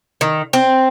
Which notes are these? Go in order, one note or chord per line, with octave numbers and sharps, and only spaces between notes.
D#3
C4